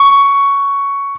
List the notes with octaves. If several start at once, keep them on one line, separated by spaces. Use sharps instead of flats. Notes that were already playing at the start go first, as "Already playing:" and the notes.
Already playing: C#6